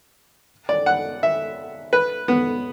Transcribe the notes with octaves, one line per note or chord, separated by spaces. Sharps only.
D5
F#5
E5
B4
B3